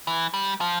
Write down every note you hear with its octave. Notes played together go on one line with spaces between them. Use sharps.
E3
G3
F3